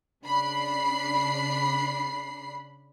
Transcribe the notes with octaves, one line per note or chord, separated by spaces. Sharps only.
C#3 D4 B5 C7